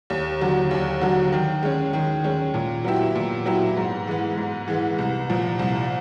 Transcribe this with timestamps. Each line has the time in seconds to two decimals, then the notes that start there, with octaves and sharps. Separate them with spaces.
0.10 D#2
0.41 D3 F#3
0.71 D#2
1.01 D3 F#3
1.32 D#3
1.63 G#3 C#4
1.93 D#3
2.24 G#3 C#4
2.54 A#2
2.84 F#3 B3 E4 G4
3.15 A#2
3.46 F#3 B3 E4 G4
3.77 G#2
4.07 E3 G#3 B3
4.37 G#2
4.68 E3 G#3 B3
4.98 C2
5.30 A#2 F3
5.59 C2